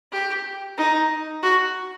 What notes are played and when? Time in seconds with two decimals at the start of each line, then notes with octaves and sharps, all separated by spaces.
0.12 G4
0.78 D#4
1.43 F#4